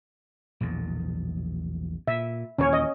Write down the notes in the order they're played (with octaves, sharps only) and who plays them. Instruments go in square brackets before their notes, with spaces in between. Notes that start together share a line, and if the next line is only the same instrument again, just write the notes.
[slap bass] A#1 E2 B2
[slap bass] A#2 [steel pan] E5
[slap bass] D#2 A#2 E3 [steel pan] C#4 C#5
[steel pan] D#5